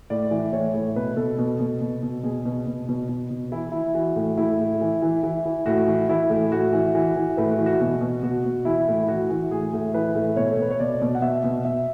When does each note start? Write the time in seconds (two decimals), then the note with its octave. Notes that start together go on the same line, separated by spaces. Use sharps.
0.10 A2 D5
0.31 E3
0.52 A2 C#5
0.74 A2
0.96 B2 B4
1.16 B2 A4
1.39 B2
1.60 B2
1.81 B2
2.03 B2
2.23 B2 G#4
2.45 B2
2.67 B2
2.89 B2
3.09 B2
3.31 B2
3.52 E3 E4
3.72 E3 E4
3.95 E3 F#4
4.16 A2
4.37 A2 E4
4.60 A2
4.81 E3
5.02 E3
5.23 E3
5.46 E3
5.66 A2 F#4
5.87 E3
6.09 E3 E4
6.30 A2
6.52 A2 F#4
6.73 E3
6.95 E3
7.16 E3
7.37 A2 B4
7.52 F#4
7.58 E3
7.66 F#4
7.80 B2 F#4
8.01 B2
8.22 B2 F#4
8.45 B2
8.65 E3 E4
8.88 A2
9.03 E4
9.08 E3 F#4
9.30 E3
9.51 A2 G#4
9.73 A2
9.94 E3 B4
10.15 A2
10.36 B2 C#5
10.51 A4
10.59 B2 B4
10.70 C#5
10.80 B2 D5
11.02 B2
11.15 F#5
11.22 B2 E5
11.44 B2
11.65 B2 E5